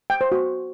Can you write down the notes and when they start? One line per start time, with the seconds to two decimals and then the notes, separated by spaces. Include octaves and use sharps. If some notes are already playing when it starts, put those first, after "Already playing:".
0.10 G5
0.21 C5
0.32 F#4